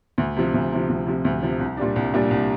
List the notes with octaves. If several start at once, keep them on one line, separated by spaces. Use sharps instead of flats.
D2
C3 F3
D2
C3 F3
D2
C3 F3
D2
C3 F3
C2
A#2 G3 D4
C2
A#2 G3 D4
C2